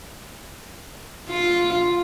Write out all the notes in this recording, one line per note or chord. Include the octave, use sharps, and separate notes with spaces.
F4